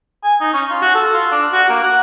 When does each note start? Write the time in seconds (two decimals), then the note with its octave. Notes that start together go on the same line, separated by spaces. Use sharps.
0.23 G#5
0.41 D#4
0.54 C#4
0.70 F4
0.82 F#4
0.95 A4
1.14 F4
1.32 D4
1.53 F#4
1.70 A#3
1.84 F#5